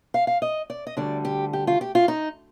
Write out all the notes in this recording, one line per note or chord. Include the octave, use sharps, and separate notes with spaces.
F5
F5
D#5
D5
D#5
D2 D3 G3 D5
G4
G4
F4
G4
F4
D#4